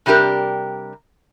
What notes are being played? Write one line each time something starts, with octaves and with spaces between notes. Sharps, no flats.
C3 G3 D4 G4 A#4